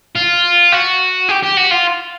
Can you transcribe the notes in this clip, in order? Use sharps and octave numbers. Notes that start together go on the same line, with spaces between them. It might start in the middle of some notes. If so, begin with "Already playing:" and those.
F4
F#4
G4
G4
F#4
F4